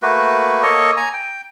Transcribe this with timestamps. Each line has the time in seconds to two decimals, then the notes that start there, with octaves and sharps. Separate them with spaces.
0.02 A3 A#3 F#4 B4
0.63 A#3 A4 C#5 D#5
0.97 G#5 A#5
1.14 G5